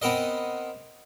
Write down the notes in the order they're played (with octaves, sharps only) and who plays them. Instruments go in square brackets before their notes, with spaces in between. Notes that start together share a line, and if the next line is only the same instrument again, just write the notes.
[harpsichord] B3 C4 A#4 D#5